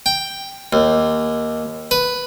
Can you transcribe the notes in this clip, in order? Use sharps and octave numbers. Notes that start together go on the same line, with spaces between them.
G5
D#2
B4